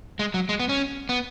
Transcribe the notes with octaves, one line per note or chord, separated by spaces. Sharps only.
G#3
F#3
G#3
B3
C#4
B3